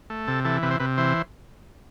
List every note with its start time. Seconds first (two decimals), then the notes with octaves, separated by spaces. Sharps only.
0.10 A3
0.28 C3 A4
0.45 E3 A4
0.63 C3 B4
0.71 C5
0.80 C3 B4
0.98 E3 C5